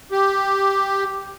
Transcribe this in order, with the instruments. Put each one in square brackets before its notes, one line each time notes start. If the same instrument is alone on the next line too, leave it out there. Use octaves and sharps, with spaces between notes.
[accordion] G4